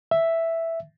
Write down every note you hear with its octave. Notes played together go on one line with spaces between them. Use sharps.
E5